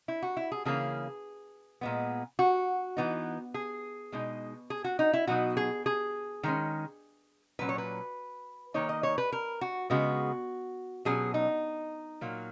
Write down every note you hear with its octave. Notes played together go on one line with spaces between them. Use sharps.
E4
F#4
E4
G#4
C#3 E3 A#3 C#4 G#4
A#2 G#3 B3
F#4
E3 B3 D#4
G#4
B2 G#3 D#4
G#4
F#4
D#4
E4
B2 F#3 B3 D#4 F#4
G#4
G#4
D#3 G#3 C#4
A#2 F#3 C#4 B4
C#5
B4
D#3 A#3 D#4 C#5
D#5
C#5
B4
A#4
F#4
C#3 G#3 B3 F#4
B2 F#3 C#4 G#4
D#4
A#2 F#3 A#3